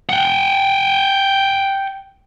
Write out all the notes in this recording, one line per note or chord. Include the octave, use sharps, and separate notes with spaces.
F#5 G5